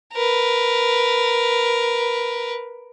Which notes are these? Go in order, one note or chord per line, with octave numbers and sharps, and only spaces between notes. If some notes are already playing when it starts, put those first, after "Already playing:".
A#4 B4